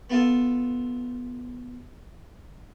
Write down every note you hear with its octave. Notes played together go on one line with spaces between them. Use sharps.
B3 F4 A4